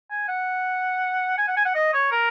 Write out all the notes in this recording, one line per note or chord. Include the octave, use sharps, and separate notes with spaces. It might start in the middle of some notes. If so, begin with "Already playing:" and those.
G#5
F#5
G#5
F#5
G#5
F#5
D#5
C#5
A#4